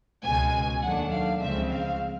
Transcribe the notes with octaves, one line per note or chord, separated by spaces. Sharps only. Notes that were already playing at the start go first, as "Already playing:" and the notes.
C#2 B2 G#3 G#5
D#2 D#3 F#3 A3 D4 F#5
F5
C#2 C#3 F3 G#3 C4 E5
F5